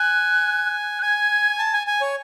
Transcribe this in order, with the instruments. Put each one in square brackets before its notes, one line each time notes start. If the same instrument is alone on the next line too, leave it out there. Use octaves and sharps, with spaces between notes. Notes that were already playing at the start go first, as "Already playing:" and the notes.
Already playing: [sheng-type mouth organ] G#5 [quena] F#6
[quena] F#6
[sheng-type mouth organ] G#5 [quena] G#6
[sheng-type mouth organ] A5
G#5
G#5
C#5